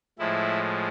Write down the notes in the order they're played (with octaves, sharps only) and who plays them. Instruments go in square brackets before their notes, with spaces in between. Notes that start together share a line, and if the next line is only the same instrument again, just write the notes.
[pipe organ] A2 F3 G#3 E4